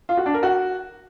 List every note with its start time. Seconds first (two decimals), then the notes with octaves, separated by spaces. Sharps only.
0.09 F4
0.17 F#4
0.26 D4
0.34 A#4
0.43 F#4